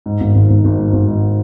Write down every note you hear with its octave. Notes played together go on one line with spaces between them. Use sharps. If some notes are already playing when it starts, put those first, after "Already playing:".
G#2
G#1
G#1
G#1
G#1
G#2
G#1
G#2